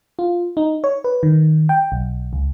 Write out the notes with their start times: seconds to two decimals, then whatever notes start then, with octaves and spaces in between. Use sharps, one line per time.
0.19 F4
0.57 D#4
0.84 C#5
1.04 B4
1.23 D#3
1.69 G5
1.92 B1
2.33 C#2